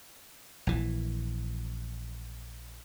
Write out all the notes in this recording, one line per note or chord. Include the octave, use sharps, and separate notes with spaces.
A#1 E3